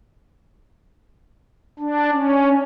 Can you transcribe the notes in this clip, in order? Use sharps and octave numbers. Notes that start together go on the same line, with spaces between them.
D4
C#4